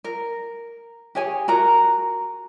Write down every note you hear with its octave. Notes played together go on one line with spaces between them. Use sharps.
A#4
G4 G#4 C#5 G#5
F#4 A#4 A#5